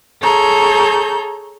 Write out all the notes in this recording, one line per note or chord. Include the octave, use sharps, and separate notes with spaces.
G#4 A4 C#5 A#5 G6